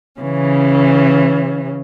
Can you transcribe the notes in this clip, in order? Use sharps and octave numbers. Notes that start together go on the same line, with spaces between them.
C#3 E3 C#4